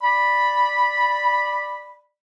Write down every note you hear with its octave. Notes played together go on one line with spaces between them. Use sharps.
D5 B5